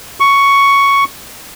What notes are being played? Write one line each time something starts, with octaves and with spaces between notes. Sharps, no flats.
C#6